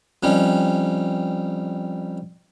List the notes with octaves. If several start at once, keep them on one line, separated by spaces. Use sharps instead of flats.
F2 G3 C#4 D#4